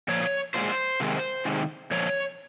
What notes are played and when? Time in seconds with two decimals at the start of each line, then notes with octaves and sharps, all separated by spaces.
0.08 A#2 F3 C#5
0.54 A#2 F3 G#3 C5
1.00 C3 D#3 G#3
1.45 C3 D#3 G#3
1.91 A#2 F3 C#5